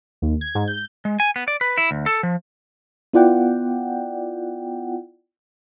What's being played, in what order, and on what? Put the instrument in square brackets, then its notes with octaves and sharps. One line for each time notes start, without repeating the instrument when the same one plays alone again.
[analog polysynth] D#2
G#6
G#2
G6
[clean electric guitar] G#3
G#5
B3
D5
B4
E4
D2
A4
F3
[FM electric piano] B3 E4 F4 D5 F#5 G5